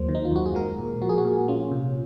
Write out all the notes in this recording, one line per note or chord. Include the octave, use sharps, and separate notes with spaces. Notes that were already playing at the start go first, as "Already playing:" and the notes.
Already playing: D#2 F#3 A#3 C5
D#3
D#4
F4
F#2 F#4
G#4
G#3 A#4
A#2
F3 F#4
G#4
F#4
A#2
C#4 F4
C3